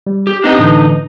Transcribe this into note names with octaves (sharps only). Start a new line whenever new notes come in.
G3
G4
B3 C4 D4 D#4 G4 D#5
A2 D3 E3